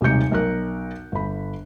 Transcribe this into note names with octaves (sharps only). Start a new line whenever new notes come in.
D#1 C3 G#3 D#4 G6 C#7
B1 A#4 F#6
G1 B5